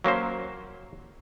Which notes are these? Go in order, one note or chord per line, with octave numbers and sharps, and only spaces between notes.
F#3 A#3 C#4 C5